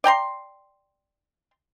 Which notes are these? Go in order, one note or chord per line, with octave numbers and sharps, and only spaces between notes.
D5 G5 A#5 C6